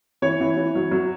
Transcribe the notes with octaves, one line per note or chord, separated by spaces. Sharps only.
E3 C#5
E3
E3
F#3
F#3